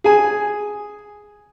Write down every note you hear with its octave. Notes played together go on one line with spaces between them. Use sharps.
G#4 G#5